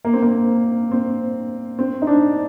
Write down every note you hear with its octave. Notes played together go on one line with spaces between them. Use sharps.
A#3
C4
A#3
C4
C4
D#4
D4